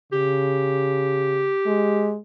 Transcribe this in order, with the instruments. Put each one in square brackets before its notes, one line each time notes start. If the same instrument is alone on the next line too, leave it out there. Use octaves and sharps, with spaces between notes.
[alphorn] C#3 [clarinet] G4
[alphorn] G#3